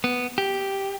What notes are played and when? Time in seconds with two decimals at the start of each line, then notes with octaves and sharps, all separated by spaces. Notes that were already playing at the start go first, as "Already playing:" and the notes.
0.04 B3
0.38 G4